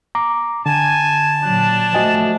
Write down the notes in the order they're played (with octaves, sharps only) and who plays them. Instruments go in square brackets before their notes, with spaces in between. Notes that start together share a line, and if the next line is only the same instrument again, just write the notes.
[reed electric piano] A#5 D6
[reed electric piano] D3 [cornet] G#5 [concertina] A5
[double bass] A#2 F#3 [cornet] D4
[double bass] F3 A3 [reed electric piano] F#4 D#5 G#5